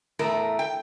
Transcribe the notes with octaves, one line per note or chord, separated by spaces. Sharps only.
E2 A2 A3 A#4
G5